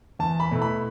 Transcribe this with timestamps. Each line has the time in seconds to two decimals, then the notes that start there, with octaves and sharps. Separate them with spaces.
0.19 E2 A5
0.40 B5
0.51 B2 A3 E4
0.62 B5